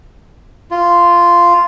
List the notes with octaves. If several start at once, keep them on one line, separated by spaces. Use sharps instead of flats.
F4